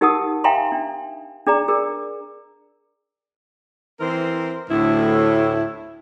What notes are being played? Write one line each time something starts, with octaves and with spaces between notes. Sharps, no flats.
D#4 G4 A#4 F#5 A5 D#6
E5 F5 G5 G#5 A#5 C6
D4
D4 G#4 D5 A#5
G#4 A#4
E3 C4 A#4 C5
D2 A2 E4